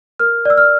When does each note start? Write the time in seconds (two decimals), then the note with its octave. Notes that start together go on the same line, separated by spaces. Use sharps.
0.20 A#4 F6
0.45 D5 E6
0.57 F6